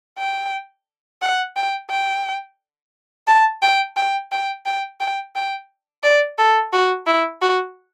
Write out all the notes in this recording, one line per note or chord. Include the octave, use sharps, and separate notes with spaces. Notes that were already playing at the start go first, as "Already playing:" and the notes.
G5
F#5
G5
G5
A5
G5
G5
G5
G5
G5
G5
D5
A4
F#4
E4
F#4